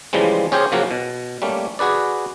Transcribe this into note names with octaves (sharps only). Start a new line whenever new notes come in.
C#3 E3 F3 G3 G#3
C#4 G4 G#4 C5 C#5 G5
C#3 F3 F#3 A#3 C#4 F#4
B2
G3 A3 A#3 C#4
F#4 G#4 B4 D5